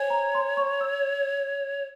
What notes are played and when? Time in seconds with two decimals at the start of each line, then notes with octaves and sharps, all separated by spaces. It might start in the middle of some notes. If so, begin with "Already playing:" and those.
Already playing: C5 C#5 G#5
0.10 A#5
0.35 C6
0.57 C#6
0.81 E6